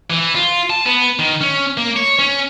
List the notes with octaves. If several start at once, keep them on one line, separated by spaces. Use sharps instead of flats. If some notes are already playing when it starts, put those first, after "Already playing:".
E3
F4
A5
B3
D#3
C#4
A#3
C#5
C#4